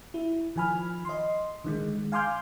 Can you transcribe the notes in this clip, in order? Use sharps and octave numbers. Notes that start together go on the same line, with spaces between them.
E4
D#3 F3 G#5 B5 F6
D#5 C6
D3 D#3 G#3
F5 G#5 C6 D6 F6 G6